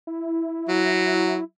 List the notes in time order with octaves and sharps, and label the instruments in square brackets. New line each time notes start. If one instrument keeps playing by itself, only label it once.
[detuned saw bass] E4
[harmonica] F#3